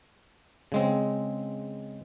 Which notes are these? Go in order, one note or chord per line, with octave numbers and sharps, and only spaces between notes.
C#3 G#3 C4